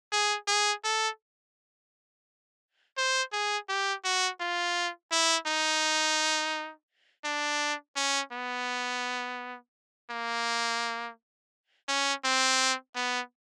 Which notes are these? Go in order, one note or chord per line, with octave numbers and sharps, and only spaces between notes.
G#4
G#4
A4
C5
G#4
G4
F#4
F4
E4
D#4
D4
C#4
B3
A#3
C#4
C4
B3